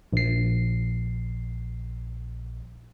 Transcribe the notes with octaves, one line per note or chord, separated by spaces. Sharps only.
A#1 C7